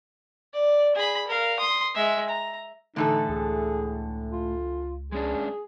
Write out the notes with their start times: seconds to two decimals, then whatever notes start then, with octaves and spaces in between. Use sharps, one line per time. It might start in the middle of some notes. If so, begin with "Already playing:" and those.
0.54 D5
0.95 G#4 B5
1.27 A#4 F5
1.60 C6 D#6
1.95 G#3 E5
2.30 A#5
2.96 A2 D3 E3 D#4 A4
3.29 C#2 G#4
4.32 F4
5.12 G#3 C#4 D4 G#4